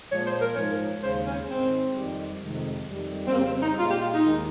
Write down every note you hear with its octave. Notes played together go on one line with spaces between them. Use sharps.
A#2 F3 G#3 C#5
C5
A#4
G#2 F3 G#3 C#5
D#2 C#3 G#3 C5
C#4
G#2 D#3 G#3 C4
F2 D#3 G3
F2 C3 D#3 G#3
F2 D#3 G3
C4
F2 C#3 G3 A#3
C4
D#4
A#2 G#3 F4
G4
F4
D#4
D#2 D#3 G#3